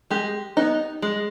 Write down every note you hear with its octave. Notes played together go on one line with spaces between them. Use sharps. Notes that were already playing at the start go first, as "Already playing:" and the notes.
G#3 G4
B3 D#4
G#3